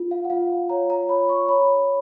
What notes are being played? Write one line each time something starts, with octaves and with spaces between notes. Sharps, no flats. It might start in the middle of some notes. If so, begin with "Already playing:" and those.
Already playing: F4
F5
F#5
F4 F5
F5
C#5 A#5
A#5
C#5 B5
C#6
C#5 B5